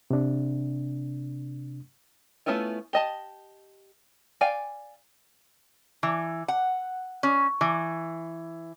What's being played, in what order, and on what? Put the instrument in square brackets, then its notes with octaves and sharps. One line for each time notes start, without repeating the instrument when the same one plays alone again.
[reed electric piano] C3 D4
[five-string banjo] A3 B3 C#4 E4 F4
G4 D#5 A5
D5 F5 G5 G#5
[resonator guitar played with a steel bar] E3
F#5
C#4
E3